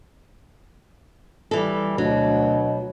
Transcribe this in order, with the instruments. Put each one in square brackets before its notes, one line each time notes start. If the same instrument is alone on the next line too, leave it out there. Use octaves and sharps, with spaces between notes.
[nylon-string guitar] E3 A4 [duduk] G3
[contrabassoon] D2 [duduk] B2 [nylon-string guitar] F#3